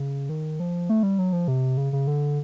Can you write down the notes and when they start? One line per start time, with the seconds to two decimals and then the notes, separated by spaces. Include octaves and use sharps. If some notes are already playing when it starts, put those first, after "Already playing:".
Already playing: C#3
0.29 D#3
0.60 F3
0.89 A3
1.03 G3
1.19 F#3
1.33 F3
1.48 C3
1.77 C#3
1.93 C#3
2.07 D3